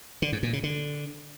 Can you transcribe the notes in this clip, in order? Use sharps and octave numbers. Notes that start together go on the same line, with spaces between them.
D3
G#2
A#2
C#3
D3